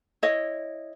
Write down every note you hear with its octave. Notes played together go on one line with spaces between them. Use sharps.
E4 C#5 D#5